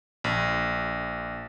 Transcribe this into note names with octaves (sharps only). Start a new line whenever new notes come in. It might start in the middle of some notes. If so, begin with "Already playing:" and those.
A#1